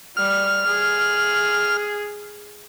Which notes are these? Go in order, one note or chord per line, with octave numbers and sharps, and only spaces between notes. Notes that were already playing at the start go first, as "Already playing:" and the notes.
G3 F6
G#4